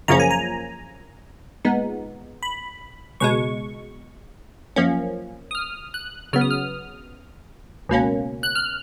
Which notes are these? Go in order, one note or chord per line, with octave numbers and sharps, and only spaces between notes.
F#2 C#3 F3 A#3 C#4 A#5
G#5
A#5
A#2 G#3 B3 D#4
B5
C#2 B2 G#3 C#6
F#2 F3 A#3 C#4
D#6
F6
F#6
C#3 F#3 B3 F6
D#6
F6
C#2 B2 A#3 C#4
F#6
F6